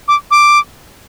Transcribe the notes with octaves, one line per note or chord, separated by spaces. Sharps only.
D6
D6